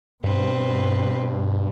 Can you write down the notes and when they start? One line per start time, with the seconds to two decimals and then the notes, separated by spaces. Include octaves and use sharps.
0.24 G2 B2 C4 B4